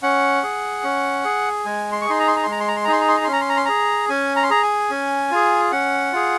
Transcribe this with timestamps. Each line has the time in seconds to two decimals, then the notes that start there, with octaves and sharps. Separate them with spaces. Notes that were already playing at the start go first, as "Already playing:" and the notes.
0.03 C#4 F#5
0.43 G#4
0.84 C#4
1.25 G#4
1.65 G#3 G#5
1.92 C6
2.01 C#6
2.06 D#4 G#4 C6
2.20 A#5
2.28 C6
2.36 A#5
2.44 C6
2.47 G#3 A#5
2.60 C6
2.68 A#5
2.76 C6
2.84 A#5
2.88 D#4 G#4 C6
3.00 A#5
3.09 C6
3.17 A#5
3.24 C6
3.28 C#4 A#5
3.41 C6
3.49 A#5
3.57 C6
3.65 G#4 A#5
4.09 C#4 G#5
4.36 A#5
4.43 C6
4.50 G#4 A#5
4.63 G#5
4.90 C#4
5.31 F4 G#4
5.72 C#4 F#5
6.13 F4 G#4